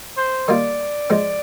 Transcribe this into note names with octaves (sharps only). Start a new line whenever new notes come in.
C5
D#3 G3 A#3 F4 D5
G#2 F3 G#3 C4